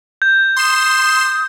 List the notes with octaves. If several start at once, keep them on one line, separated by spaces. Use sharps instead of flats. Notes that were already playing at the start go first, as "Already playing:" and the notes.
G6
C6 D#6 E7